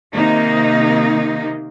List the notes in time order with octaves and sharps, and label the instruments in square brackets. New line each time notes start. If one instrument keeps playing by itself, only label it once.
[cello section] C3 D#3 A#3 D#4